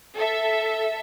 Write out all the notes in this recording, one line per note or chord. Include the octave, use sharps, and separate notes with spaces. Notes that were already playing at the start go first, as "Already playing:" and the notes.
A4 E5